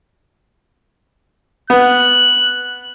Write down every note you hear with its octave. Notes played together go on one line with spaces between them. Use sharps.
B3 F#6